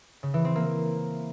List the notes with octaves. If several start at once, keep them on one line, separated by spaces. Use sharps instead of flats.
C#3
E3
C4
A#3